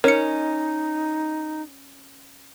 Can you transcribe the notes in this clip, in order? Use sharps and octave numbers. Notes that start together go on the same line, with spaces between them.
C#4 D#4 A#4 C#7